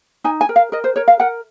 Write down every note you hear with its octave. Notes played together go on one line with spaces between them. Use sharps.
D#4 G#5
G#5
A#4
F5
A#4 D#5
C5
A#4 C#5
F5
A#4 F#5